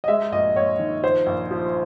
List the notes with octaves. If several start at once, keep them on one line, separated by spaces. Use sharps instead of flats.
D#5
G#3 E5
A#1 D#5
A#1 C#5
D#3
F3 C5
A#1
F3